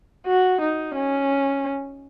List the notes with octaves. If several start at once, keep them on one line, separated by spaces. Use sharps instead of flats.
F#4
D#4
C#4